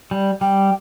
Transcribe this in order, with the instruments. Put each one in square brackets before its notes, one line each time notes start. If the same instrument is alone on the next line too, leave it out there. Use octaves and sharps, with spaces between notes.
[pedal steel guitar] G3
[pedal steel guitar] G3 [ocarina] G5